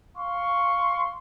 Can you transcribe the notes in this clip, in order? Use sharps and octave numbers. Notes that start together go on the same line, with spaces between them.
F5 C6 C#6